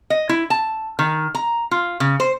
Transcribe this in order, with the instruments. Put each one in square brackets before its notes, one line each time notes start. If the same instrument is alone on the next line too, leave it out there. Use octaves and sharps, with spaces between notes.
[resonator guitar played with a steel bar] D#5
E4
A5
D#3
A#5
F4
C#3
C5